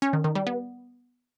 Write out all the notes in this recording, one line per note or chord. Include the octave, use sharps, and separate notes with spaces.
C#4
D#3
D#3
G3
B3